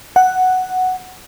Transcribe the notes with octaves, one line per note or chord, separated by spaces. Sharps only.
F#5